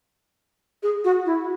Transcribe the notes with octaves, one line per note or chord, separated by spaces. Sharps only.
G#4
F#4
E4